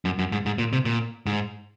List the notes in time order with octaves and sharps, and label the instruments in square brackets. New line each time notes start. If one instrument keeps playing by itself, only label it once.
[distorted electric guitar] F#2
F#2
G#2
G#2
A#2
C3
A#2
G#2